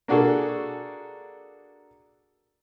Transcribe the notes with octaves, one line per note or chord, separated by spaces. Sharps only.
A#3 D4 F#4 G#4 A4